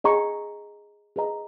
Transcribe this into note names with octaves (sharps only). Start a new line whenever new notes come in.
G#4 D#5 A#5 C#6
G#4 B4 D#5 A#5